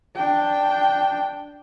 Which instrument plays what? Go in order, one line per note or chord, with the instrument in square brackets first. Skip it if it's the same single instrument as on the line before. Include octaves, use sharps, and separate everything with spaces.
[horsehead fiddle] D4 G5